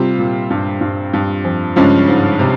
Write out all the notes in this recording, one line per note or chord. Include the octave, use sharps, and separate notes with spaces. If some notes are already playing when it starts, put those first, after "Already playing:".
Already playing: C3 G3 C4 F4
A#2
G2
G2
G2
F2
G2 C#3 F3 G#3 C#4
G#2
C3